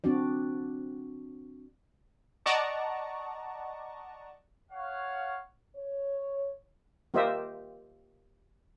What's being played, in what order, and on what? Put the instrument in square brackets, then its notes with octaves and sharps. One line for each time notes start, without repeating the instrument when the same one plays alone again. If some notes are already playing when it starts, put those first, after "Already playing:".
[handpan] C4 D4 F#4 D5
[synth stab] D5 D#5 F#5 A5 A#5 C#6
[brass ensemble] C#5 F5 F#5
[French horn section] C#5
[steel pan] A#3 F4 G4 C5 D#5 E5